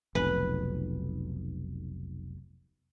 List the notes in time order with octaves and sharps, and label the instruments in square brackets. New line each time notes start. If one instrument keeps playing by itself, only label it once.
[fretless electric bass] F1 B1 [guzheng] B4